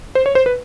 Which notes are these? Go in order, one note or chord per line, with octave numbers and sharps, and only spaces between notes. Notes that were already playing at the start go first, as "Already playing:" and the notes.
C5
C#5
C5
B4